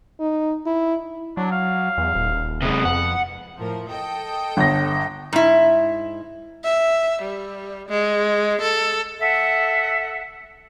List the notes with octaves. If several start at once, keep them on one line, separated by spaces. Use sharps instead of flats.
D#4
E4
F#3 D4
F5
E2
D#1
C3 G#3 B3
F2 F#5
A2 F3 A#4
A4 D#5 G5
G1 A#6
G#2 E4
E5
G3
G#3
A4
A4 E5 F#5